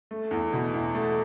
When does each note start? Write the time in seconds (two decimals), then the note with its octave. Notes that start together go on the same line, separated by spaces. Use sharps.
0.11 A3
0.31 E2
0.53 B2
0.74 E2
0.95 A3